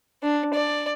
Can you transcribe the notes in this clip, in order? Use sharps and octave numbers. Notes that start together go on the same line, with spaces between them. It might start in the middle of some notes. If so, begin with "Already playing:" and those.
D4
D5